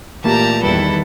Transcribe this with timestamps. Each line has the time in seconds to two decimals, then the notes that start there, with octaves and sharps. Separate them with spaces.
0.24 A#2 E3 A3 A#3 G4 A5 A#5
0.63 E2 D#3 G3 E4 A4 B4